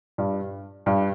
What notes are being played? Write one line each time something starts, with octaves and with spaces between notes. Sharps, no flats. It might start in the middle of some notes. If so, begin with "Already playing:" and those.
G2
G2